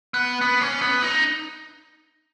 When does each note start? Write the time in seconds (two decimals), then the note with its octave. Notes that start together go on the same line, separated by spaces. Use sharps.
0.14 B3
0.41 B3
0.61 C#4
0.82 B3
1.02 D#4